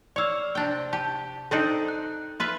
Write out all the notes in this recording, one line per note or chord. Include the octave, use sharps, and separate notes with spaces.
C#5 D5 F5 E6
C3 D4 G5
G4 A5
C4 D4 D#4 A4
F#6
F4 B4 E5